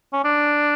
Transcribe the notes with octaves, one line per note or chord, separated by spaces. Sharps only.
C#4
D4